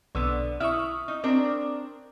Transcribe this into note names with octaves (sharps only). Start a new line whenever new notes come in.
B1 D3 B3 E6
E4 E5 C#6 D#6 F6
D#4
C4 D4 A#4